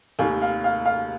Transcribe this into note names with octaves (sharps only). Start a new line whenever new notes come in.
F1 D#2 D#3 F5 G#5
F5
F5
F5